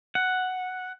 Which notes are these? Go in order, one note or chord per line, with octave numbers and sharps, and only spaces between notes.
F#5